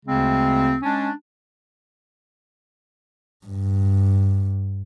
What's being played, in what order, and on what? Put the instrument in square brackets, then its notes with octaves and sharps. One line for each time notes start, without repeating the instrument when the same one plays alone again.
[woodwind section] D2 C#3 G#3 C4
G#3 C#4 D4
[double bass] G2